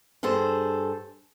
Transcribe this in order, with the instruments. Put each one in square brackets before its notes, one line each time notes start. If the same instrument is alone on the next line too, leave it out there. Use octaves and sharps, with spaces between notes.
[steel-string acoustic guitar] G2 G#4 A4 C5